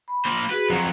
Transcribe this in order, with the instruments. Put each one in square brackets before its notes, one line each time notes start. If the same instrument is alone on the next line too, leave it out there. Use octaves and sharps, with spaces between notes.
[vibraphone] B5
[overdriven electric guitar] A#3 C5
[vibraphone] F#4 G#4 [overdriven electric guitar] B4
[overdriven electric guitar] F2 F#3 [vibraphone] C5 F#5 A#5